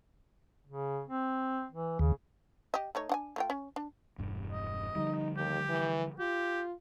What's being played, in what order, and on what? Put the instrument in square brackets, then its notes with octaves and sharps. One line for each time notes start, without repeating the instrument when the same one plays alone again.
[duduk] C#3
C4
E3
[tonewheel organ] D#2 [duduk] C#3
[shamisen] G4 D#5
A3 D#4 C#5
D4 F#5 G#5
A3 F4 G5
C#4
D4
[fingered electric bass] E1 G2
[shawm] D#5
[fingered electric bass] D3 F3 G3 [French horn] D#4
[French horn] D#2 [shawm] G4
[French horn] E3
[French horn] F4 [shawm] G4